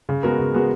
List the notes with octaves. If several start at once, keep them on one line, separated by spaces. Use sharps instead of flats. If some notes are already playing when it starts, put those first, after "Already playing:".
C#3
G#3 B3 F#4 A#4
C#3
G#3 B3 F#4 A#4